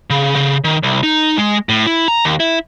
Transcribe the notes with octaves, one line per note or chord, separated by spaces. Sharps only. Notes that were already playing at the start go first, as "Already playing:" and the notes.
C#3
C#3
D#3
C2
D#4
G#3
A2
E4
A#5
D#2
E4